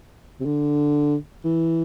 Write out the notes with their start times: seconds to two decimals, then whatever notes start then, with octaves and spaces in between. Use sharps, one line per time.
0.40 C3
0.45 D3
1.44 E3